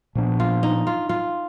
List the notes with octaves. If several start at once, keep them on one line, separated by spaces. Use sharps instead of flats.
A#2 F3 B3 D4
F4
D#4
F4
F4